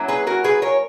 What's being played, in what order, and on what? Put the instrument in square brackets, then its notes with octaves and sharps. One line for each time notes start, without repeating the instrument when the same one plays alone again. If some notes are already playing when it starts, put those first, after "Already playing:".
Already playing: [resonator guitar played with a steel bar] F#3 A#3 C#4 E4
G#4 B4
F#4 A#4
G#4 B4
A#4 C#5